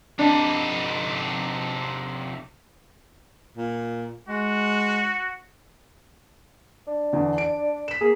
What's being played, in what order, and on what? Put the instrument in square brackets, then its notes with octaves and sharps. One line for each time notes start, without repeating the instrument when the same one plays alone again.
[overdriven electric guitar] C3 D#4 [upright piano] D4
[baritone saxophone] A#2
[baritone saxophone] G#3 [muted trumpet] F#4
[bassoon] D4
[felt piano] E2 D3
D7
B6 E7
[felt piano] A#3 [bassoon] G#4